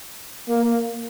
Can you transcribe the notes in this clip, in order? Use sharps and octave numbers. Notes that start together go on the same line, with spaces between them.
A#3